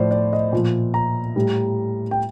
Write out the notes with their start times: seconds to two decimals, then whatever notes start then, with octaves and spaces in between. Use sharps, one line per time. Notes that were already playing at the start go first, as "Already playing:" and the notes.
Already playing: A2 F3 C5 D5
0.11 D5
0.33 D#5
0.53 A#2 F3
0.94 A#5
1.36 A2 G3
2.11 G5